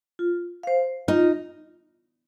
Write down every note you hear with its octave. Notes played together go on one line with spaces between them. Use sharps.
F4
C5 F5
D#4 F4